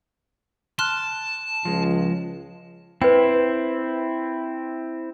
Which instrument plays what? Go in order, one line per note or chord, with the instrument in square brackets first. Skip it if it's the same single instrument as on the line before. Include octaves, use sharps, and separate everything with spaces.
[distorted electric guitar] A5 [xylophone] C6 F6 F#6
[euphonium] C#2 [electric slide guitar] F3 G#3
[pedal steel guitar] C4 E4 [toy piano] B4 G5